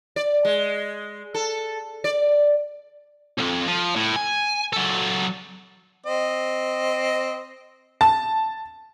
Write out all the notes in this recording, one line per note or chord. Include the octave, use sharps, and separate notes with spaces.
D5
G#3
A4
D5
C2 F2
F3
A2
G#5
F#3 A4
C4 D#5
A5